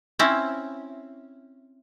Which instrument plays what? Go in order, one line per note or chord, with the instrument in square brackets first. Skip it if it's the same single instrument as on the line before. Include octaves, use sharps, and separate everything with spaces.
[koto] C4 C#4 E4